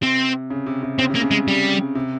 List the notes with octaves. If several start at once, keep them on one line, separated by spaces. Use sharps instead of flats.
C3 C4
C#3
C3
C3
C#3 C4
C3
A#3
C#3
G#3
G3
C3